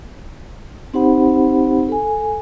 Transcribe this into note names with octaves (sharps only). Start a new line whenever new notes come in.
C4 D#4 G4 C5 F#5 B5
A4 G#5